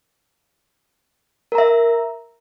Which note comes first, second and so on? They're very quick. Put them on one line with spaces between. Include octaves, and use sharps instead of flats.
A#4 A#5 E5